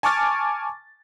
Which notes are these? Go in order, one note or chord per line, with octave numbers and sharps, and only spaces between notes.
G#5 A5 C#6 D6 F6 A6